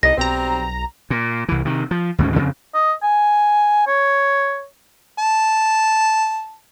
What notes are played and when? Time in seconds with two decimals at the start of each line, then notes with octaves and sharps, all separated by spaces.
0.03 C2 A2 D#4 D#5 A#6
0.17 B1 G3 C4 A#5
1.10 A#2
1.49 C2 E3
1.65 C3 D#3
1.91 F3
2.18 D2 G#2 D#3 C#4
2.34 F2 C#3 C4
2.74 D#5
3.03 G#5
3.87 C#5
5.19 A5